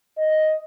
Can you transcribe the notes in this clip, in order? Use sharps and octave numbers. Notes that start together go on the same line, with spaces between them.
D#5